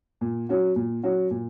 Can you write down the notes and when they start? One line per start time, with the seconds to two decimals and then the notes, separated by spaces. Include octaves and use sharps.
0.21 A#2
0.49 F#3 C#4 F#4
0.76 A#2
1.03 F#3 C#4 F#4
1.31 A#2